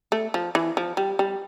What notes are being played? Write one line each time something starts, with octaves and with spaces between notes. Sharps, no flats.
A3
F3
E3
F3
G3
G3